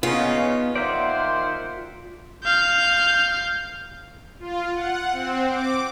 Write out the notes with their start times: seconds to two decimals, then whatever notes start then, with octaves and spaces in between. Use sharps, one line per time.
0.03 C#3 B3 D#4 F4
0.76 D#3 A#3 C5 D5 E5 F#5
2.44 F5 G6
4.40 F4
4.72 F#5
5.12 C4
5.49 D6